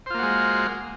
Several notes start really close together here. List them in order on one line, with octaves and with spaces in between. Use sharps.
C5 F4 A#3 F#4 G#3